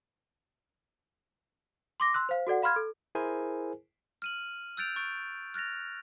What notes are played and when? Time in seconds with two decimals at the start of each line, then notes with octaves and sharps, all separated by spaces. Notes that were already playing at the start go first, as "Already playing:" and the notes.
2.00 C6 D6 A#6
2.14 C6 E6 F#6
2.29 C5 F5
2.47 F#4 A4 D5 F#5
2.62 F5 B5 C6 F6 G#6
2.76 A4
3.15 E4 G#4 A#4 C5 G#5
4.22 F6 D#7 F#7
4.77 E6 F#6 G6 A6 D7 F7
4.96 C#6 G6 A6 D7
5.54 F6 F#6 A6 A#6 F7